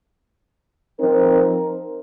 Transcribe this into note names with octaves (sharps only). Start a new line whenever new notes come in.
F3 C4 D#4 A#4